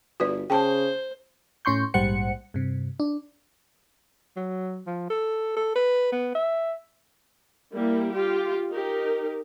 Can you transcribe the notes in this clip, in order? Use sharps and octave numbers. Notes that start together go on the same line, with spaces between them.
G1 F#4 B4 D5
C#3 C5 G5 A5
A2 C#4 C6 C#6 G6
A#1 G#2 G3 C5 F#5 C#7
G2 C3
D4
F#3
F3
A4
A4
B4
B3
E5
G3 A#3 E4
F4 G4
D#4 G4 A#4